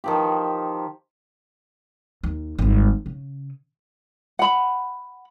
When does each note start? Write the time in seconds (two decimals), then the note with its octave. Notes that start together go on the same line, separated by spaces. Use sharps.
0.04 D#3 F3 G4
2.23 D#2
2.59 G#1 G3
3.06 C#3
4.39 F#5 B5